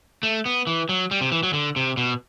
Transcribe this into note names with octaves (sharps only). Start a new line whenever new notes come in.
A3
B3
E3
F#3
G3
C3
E3
F#3
D3
C3
B2